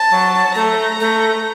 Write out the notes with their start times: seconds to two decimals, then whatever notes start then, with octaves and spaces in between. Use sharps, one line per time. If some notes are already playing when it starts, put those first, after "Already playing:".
Already playing: A5
0.10 F#3
0.55 A3 A#5
1.00 A3